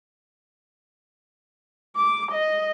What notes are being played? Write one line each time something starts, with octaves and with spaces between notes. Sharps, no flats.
D6
D#5